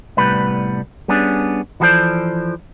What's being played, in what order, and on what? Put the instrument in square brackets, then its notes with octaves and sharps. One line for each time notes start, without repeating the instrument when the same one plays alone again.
[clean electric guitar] C2 A2 G3 B3 B4
G3 B3 C#4 D4 G#4
E3 F3 F#4 A4 C5 D5